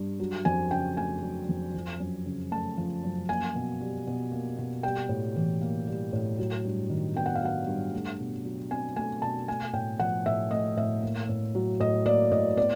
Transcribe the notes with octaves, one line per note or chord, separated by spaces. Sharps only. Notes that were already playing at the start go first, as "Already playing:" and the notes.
Already playing: G2
F#3
F2 G#5
C#3 G5
A3 G#5
F#3
F2
F3
F#2
C#3
A3 A5
F3
F#2
A#3 G#5
B2
G3
B2
A#3
B2
G3 G5
A2
E3
A#3
G3
A2
F#3
G2
D#3
B3 G5
F#5
F5
F#3 F#5
G2
A3
B2
F#3
C4 G#5
A3 G#5
B2 A5
A3 G#5
A2 G5
F3 F#5
A2 E5
A3 D#5
A2 E5
A#3
A2
F#3
A2 D#5
A#3 D5
A2 D#5
B3 D5